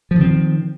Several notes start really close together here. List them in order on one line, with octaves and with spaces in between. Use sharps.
F3 D#3 C4